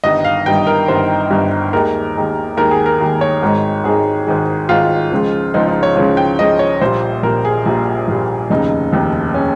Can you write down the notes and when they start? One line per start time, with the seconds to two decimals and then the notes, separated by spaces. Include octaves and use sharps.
0.04 G1 G2 D#3 D#5
0.25 F5
0.46 G1 G2 D#3 G5
0.67 A#4
0.88 G1 G2 D#3 C5
1.30 G1 G2 D#3
1.73 D#2 D#3 G#3 A#4
2.15 D#2 D#3 G#3
2.57 D#2 D#3 G#3 A#4
2.71 G#4
2.86 A#4
3.00 D#2 D#3 G#3
3.21 C#5
3.42 G#1 G#2 D#3 G#3
3.84 G#1 G#2 D#3 G#3 G#4
4.27 G#1 G#2 D#3 G#3
4.69 G#1 G#2 D#3 G#3 F4
5.11 C#2 C#3 F3 G#3
5.54 C#2 C#3 F3 G#3 D#4
5.68 D#4
5.83 C#5
5.96 C#2 C#3 F3 G#3 C#5
6.17 G5
6.39 C#2 C#3 F3 G#3 D#5
6.59 C#5
6.81 A#1 A#2 G3 C5
7.23 A#1 A#2 G3 A#4
7.45 G#4
7.66 A#1 A#2 G3
8.08 A#1 A#2 G3
8.50 F1 D#2 C#3 D#4
8.93 F1 D#2 C#3
9.34 C#3 C#4